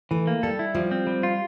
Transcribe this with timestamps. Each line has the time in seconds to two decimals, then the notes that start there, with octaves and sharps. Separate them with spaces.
0.11 E3 A3
0.27 A#3
0.43 G3 A4
0.59 E4
0.75 F3 G3
0.91 C4
1.07 G3
1.23 F4